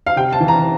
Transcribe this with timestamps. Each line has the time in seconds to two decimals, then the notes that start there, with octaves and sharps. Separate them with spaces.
0.06 F5
0.16 C3 G5
0.33 A5
0.40 E3
0.48 A#5